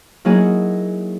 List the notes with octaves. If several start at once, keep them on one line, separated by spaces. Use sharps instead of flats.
F#3 A#3 D#4 E4 F#4 G#4